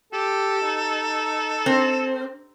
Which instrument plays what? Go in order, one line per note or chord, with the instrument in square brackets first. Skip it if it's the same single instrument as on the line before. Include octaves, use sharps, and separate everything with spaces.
[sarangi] G4 [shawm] A4
[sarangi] D#4
[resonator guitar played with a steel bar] C4